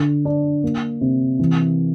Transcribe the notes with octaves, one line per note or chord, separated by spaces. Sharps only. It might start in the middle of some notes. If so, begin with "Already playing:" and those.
Already playing: D3
D4
A#3
C3
E3